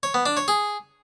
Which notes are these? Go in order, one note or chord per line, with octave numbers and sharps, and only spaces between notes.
C#5
B3
D4
C#5
G#4